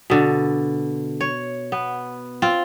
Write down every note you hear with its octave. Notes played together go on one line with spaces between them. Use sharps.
B2 D3
C#5
B3
C4 F4